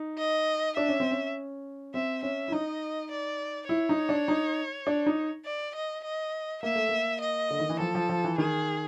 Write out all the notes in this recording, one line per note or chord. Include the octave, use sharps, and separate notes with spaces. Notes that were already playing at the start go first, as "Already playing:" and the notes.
Already playing: D#4
D#5
D4 E5
C#4
C4
C#4
C4 E5
C#4 E5
E4
D#4 D#5
D5
E4 C#5
D#4
D4
D#4
D4
D#4
D5
D#5
D#5
A#3 E5
A3
A#3
D#5
D3
D#3
E3
F3 A4
F3
F3
E3
D#3 G#4